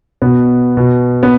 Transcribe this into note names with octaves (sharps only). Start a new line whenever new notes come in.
B2 B3
B2
B3